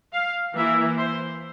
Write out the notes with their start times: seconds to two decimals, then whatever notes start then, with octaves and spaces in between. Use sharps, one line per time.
0.13 F5
0.55 E3 A#3 E4 E5
0.98 C5